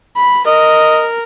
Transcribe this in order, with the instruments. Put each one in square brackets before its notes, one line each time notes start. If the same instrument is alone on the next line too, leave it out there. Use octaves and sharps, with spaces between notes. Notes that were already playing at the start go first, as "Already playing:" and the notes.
[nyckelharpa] B5
[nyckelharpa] A#4 [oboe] D#5